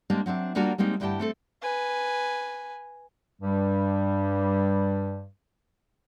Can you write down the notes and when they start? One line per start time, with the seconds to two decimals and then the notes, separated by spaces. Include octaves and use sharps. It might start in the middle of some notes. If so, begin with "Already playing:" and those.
0.10 G3 G#3 A#3 C4 D4
0.26 F#3 C4 D4 E5
0.55 G3 A#3 D4 F4 F#4 A#4
0.78 G3 G#3 A#3 C4 D#4
1.00 D2 G2 E4 G4 G5 A5
1.20 A3 C4 A4
1.62 B4 G#5
3.42 G2 G3